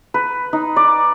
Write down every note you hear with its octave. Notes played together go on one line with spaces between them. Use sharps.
B4
D#4
D5